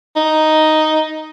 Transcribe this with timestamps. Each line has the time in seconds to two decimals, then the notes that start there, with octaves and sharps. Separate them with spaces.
0.16 D#4